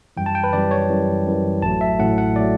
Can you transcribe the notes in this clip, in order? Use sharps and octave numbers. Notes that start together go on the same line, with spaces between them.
F#2 E3 G3 G5
A5
G5
B4
F#2 E3 G3 D5
C#5
F#2 E3 G3
F#2 E3 G3
A1 A2 F#3 A3 A5
E5
A1 A2 F#3 A3 F#5
F#5
A2 F#3 A3 D5